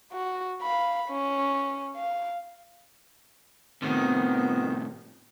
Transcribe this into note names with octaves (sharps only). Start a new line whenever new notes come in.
F#4
F5 B5
C#4
F5
F2 A2 C3 D#3 B3 C4